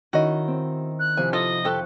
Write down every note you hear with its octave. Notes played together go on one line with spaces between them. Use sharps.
D#3 C#4 E4 F#4 D#5
C4
F#6
C3 F3 E4 G#5
F4 A4 D#5
F2 G4 A4 C#6 F#6